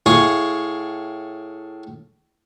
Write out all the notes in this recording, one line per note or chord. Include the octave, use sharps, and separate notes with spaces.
A2 G#4 F5 C#6 D#6